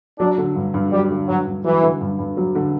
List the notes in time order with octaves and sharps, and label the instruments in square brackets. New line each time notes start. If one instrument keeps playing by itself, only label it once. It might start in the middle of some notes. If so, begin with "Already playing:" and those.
[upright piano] F#3 [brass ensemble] D4
[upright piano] D3
G2
G2
[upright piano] F#3 [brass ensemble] G3
[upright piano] D3
[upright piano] G2 [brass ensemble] F#3
[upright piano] G2
[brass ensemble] E3 [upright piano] F#3
[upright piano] D3
G2
G2
F#3
D3